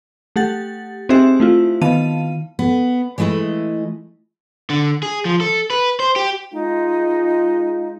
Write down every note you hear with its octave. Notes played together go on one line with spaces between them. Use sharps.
A3 G4 F#5 A6
C4 D#4 G4 G#4 C5 E5
A3 E4 F4
D#3 B3 F5 A5 D#7
B3
E3 G#3 A3 E4 D#5
D3
G#4
F3
A4
B4
C5
G4
G#3 D#4 F4